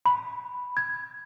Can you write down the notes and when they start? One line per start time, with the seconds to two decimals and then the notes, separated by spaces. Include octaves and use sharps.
0.06 B5
0.77 G#6